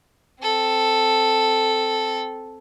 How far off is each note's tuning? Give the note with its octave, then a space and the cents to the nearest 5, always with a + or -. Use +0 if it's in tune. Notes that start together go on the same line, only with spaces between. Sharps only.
C4 +0 A4 +0